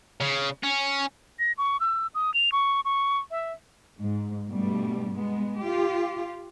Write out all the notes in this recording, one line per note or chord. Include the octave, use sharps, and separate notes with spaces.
C#3
C#4
A#6
C#6
E6
D#6
F7
C#6
C#6
E5
G#2
G2 B2 G3 A3
G#3 B3
F4 G4